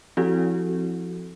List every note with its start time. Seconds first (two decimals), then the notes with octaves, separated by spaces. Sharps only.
0.17 F3 C4 E4 F#4 G4 A4